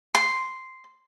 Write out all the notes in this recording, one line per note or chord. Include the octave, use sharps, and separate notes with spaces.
C6